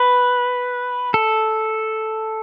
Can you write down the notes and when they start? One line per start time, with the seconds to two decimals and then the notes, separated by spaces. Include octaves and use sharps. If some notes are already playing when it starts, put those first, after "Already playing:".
Already playing: B4
1.14 A4